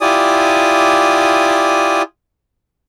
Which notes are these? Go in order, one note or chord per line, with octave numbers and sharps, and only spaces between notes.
E4 F4 G4 D5 G#5 D#6